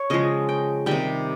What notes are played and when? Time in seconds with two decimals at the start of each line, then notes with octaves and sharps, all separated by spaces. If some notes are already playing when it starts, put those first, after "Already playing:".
Already playing: C#5
0.10 C#3 F3 G#3 D#5
0.49 G5
0.86 C3 D#3 G3 G5